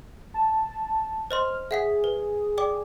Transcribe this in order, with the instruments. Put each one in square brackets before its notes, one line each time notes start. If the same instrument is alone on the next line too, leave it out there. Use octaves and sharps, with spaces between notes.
[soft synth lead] A5
[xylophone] C5 D#5 C6 [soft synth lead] F6
[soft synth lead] G#4 [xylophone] E5 F#5 B6
[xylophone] B4
D5 G5 D6